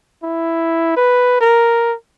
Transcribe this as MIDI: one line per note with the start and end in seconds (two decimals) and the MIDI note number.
0.23 0.92 64
0.97 1.39 71
1.41 1.94 70